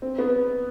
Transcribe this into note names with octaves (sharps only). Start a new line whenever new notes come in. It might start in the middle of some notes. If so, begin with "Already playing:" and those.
C4
B3